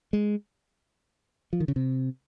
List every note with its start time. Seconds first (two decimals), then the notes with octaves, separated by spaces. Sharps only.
0.13 G#3
1.53 F3
1.60 D#3
1.68 C#3
1.76 C3